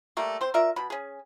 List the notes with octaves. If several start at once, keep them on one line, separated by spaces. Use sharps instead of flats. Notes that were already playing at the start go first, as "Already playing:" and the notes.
G3 A3 A#3
C4 C5
F4 A#4 D5 E5
B2 B5
C#4 G#4